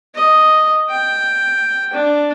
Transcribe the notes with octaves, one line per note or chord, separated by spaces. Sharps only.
D#5
G5
D4